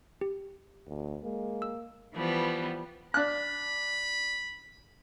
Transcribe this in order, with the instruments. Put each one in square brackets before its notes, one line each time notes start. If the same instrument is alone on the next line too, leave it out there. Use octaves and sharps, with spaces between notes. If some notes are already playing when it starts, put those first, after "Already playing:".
[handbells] G4
[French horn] D2
[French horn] G#3 [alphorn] A#3
[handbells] E6
[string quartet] E3 F3 G3 B3
[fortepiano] D4 F#6 [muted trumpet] B5